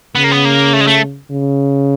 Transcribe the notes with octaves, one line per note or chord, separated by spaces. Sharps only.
C#3 B3
A#3
B3
A#3
A3
G#3
A3
C#3